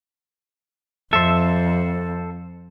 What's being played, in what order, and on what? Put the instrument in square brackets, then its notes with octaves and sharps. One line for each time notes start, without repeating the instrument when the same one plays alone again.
[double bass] F2 [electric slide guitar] A4 C5 [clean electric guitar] E5